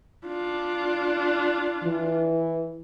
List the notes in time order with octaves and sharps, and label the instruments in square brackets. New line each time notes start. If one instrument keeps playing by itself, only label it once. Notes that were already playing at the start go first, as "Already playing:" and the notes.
[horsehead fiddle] D4 F4
[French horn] E3